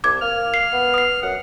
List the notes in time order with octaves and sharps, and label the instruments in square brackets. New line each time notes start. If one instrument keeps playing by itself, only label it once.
[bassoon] C2 [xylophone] D6 G#6
[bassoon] A#3 [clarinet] F6
[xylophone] C7
[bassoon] B3
[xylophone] D#6 C7
[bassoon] F#2 [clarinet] F#5